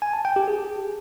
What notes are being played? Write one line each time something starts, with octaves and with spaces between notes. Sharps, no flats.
G#5
A5
G5
G4
G#4